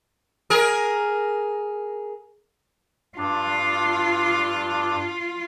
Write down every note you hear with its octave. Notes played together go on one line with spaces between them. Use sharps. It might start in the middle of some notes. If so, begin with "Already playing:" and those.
G#4 A#4
G2 D4 F4